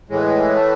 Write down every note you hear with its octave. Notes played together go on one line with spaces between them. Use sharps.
A2 E3 G#3
A3